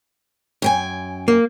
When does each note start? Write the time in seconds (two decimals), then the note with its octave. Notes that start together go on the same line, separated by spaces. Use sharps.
0.62 F#2 G5 G#5
1.28 A#3